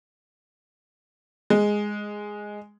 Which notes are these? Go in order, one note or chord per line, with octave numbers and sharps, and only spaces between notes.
G#3